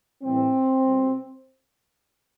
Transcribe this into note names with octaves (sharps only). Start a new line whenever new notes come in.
A2 E3 G3 C4
B2 G3